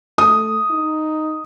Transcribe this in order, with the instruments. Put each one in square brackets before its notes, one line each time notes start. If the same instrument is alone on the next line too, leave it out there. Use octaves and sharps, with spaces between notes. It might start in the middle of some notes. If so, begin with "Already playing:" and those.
[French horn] A3 [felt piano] D#6
[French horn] D#4